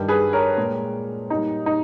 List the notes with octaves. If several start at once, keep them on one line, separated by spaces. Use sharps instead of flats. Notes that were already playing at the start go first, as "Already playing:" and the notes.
Already playing: G2 D#3 G3
G#4 B4
A#4 C#5
A#2 G#3
A#2 G3 D#4
D#4